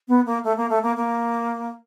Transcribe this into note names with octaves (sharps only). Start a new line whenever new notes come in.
B3
A#3
A3
A#3
A3
A#3
A#3